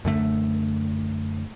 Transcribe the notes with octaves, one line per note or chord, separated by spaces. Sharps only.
F#2 D3 A3